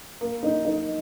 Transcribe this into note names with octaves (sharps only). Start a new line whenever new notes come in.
A#3
D#4
D#4